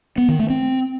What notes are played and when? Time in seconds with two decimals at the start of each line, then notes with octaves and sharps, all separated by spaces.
0.18 B3
0.29 D#3
0.39 A3
0.50 C4